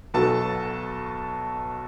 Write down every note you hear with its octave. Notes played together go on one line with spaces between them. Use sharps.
B1 B2 F#3 A4 A5